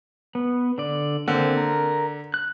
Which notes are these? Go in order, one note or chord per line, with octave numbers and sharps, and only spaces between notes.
B3
D3 D5
D3 A#3 C4
A#4
F#6